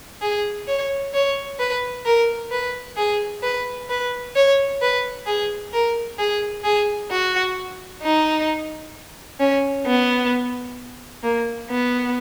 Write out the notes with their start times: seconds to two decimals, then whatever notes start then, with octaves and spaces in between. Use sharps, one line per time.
0.21 G#4
0.67 C#5
1.14 C#5
1.59 B4
2.05 A#4
2.51 B4
2.97 G#4
3.42 B4
3.90 B4
4.35 C#5
4.81 B4
5.26 G#4
5.73 A#4
6.18 G#4
6.64 G#4
7.11 F#4
8.02 D#4
9.39 C#4
9.86 B3
11.23 A#3
11.70 B3